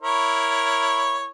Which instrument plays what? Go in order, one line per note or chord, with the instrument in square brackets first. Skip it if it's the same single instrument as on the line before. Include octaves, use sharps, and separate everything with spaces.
[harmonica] E4 A#4 C#5